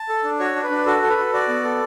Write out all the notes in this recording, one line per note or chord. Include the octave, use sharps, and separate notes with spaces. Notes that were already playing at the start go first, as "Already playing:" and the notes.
Already playing: A5
A4
D4
F#4 C#5
D4
B4
D4
F#4 A4
A4
B4
A4
F#4 D5
B3
A4